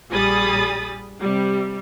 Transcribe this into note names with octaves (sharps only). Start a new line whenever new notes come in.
A#1 G3 G#4 B5 D#6 A6
C3 G3